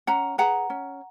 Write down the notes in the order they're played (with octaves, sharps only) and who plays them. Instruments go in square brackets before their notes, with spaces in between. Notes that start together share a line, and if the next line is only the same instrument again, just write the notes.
[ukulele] C#4 F#5 A#5
G#4 B4 F#5 A#5
C#4